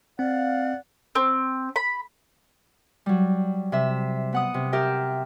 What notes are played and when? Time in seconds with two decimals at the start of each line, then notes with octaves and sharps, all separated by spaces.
0.19 C4 D5 F5 F#5
1.15 C4
1.76 B5
3.06 F#3 G3
3.72 C3 E5
4.33 B3 F#5 D#6
4.54 C3
4.73 G4 A#4 E5 G5